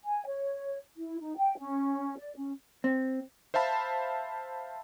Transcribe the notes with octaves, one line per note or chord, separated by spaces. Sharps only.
G#5
C#5
E4
D#4
G5
C#4
D5
C#4
C4
C5 E5 F5 A5 B5